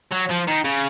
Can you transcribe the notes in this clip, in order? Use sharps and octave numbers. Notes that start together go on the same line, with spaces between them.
F#3
F3
D#3
C#3